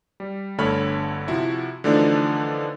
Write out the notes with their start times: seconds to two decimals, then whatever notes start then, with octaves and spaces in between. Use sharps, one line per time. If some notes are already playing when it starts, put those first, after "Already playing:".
0.20 G3
0.58 G1 D3 A3 C#5 B5 F6
1.28 C3 F3 E4 F#4
1.84 D3 E3 F3 A3 D4 D#4